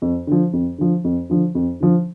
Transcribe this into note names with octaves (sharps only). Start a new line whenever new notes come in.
F2
D3 F3
F2
D3 F3
F2
D3 F3
F2
D3 F3